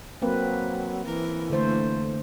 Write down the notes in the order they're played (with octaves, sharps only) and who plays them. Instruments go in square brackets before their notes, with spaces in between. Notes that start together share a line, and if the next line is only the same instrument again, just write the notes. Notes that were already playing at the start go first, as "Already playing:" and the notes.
[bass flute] F#3 [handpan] A#3 C4 B4
[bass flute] E3 [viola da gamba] A#4
[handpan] D3 C5 [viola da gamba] A3 A#3